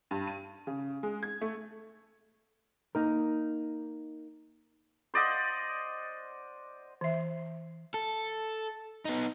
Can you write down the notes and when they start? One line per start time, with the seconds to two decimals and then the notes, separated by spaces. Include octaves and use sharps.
0.11 G2
0.27 D#7
0.67 C#3
1.03 G#3
1.23 G#6
1.41 A3
2.95 A#3 D#4 A#4
5.14 C5 D5 D#5 F#5
7.01 E3 E5
7.94 A4
9.05 B3 D#4